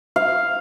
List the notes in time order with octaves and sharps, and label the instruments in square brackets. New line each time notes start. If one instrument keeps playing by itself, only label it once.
[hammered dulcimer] F5